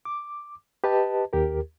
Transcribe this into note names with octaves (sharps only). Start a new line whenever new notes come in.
D6
G4 B4 D#5 A5
D#2 G4 A#4